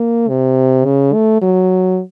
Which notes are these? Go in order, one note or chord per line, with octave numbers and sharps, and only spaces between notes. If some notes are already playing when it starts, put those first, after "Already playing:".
Already playing: A#3
C3
C#3
A3
F#3